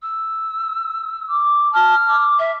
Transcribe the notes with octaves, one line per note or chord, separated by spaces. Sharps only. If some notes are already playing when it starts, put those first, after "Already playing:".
E6
D6
A5 F6
D6
E5